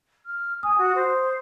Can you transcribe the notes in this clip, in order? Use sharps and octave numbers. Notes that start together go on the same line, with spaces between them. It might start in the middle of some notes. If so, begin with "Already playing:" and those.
F6
G#5 D#6
F#4
C5